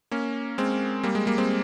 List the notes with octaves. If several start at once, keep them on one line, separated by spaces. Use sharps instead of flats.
A#3 C#4
G#3 C4
G3 A#3
G#3
G3 A#3
G#3 C4